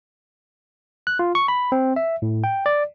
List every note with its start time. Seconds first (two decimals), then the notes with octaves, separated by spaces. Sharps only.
1.07 F#6
1.19 F4
1.35 C#6
1.48 B5
1.72 C4
1.96 E5
2.22 A2
2.44 G5
2.66 D5